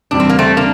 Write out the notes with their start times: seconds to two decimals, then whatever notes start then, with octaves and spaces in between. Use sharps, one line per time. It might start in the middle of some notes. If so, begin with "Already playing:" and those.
0.11 E2 C3 G3 D4
0.20 C4
0.29 A#3
0.39 A3 C4
0.57 A#3 D4